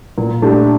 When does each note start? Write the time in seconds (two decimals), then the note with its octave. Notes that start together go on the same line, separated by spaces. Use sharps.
0.18 A#2
0.42 A3 D4 G4